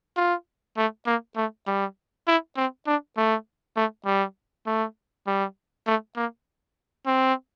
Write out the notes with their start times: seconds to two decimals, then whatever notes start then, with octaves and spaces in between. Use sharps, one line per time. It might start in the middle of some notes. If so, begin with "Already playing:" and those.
0.17 F4
0.77 A3
1.06 A#3
1.36 A3
1.67 G3
2.27 E4
2.57 C4
2.87 D4
3.17 A3
3.76 A3
4.06 G3
4.67 A3
5.27 G3
5.87 A3
6.16 A#3
7.06 C4